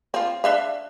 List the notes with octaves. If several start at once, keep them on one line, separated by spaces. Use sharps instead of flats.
C4 F4
D4 E5 F5